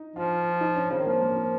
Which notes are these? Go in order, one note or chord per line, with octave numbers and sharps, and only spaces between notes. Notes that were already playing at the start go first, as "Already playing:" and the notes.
Already playing: D#4
F3 F4
D#4
C#4
C#3 C4
D#3
F3 A#3
A#3
C4